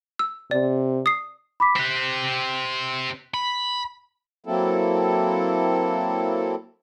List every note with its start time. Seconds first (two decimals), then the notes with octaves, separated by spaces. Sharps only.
0.19 E6
0.51 C3 D5
1.06 D#6 C7
1.60 B5 D6 B6
1.76 C4 G4 F#6 B6
3.34 B5
4.46 F#3 A#3 C4 E4 A4